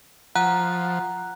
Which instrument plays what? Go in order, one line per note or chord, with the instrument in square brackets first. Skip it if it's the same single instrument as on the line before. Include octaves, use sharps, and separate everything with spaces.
[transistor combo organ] F3 [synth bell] F#5 A#5 F#6